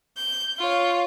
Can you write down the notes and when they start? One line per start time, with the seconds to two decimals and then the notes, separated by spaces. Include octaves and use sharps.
0.17 G6
0.58 F4 C#5